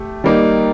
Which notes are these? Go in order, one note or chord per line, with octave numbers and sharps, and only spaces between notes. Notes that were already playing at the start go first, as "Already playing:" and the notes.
Already playing: A3 G4
G3 A#3 D#4